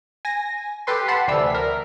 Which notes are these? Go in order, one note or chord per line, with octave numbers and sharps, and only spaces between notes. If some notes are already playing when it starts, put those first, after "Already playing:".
G#5 A#6
G4 A4 B4 C6
F#5 A5 B5 C6
D2 C3 E3 G3 E6
A#4 B6